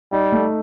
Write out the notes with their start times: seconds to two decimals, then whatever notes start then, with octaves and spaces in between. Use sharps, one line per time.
0.12 G3 D#4
0.32 A3